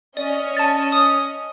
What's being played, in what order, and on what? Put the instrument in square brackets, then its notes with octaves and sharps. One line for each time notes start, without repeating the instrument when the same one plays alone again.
[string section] C#4 D#5 [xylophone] D5
[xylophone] A5 A6
D#6